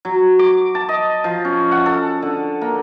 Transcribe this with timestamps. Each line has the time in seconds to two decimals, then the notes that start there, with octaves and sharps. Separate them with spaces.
0.05 F#3
0.39 D6
0.75 A5
0.89 D#5
1.24 F3
1.45 C#4
1.72 F#5
1.86 A4
2.22 D3
2.61 A#3